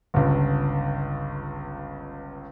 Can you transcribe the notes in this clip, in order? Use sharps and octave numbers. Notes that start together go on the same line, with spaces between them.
G1 C#2